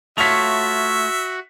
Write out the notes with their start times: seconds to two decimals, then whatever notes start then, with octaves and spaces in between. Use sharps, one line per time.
0.18 A3 F4 F#4 C#5 E5 B6 F7